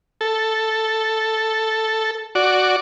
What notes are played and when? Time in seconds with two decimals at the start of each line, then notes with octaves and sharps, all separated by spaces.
0.21 A4
2.35 F#4 D5